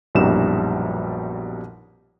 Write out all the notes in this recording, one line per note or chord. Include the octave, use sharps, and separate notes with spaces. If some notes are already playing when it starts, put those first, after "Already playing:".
A#1 F#2 B2 G3 D#4 E7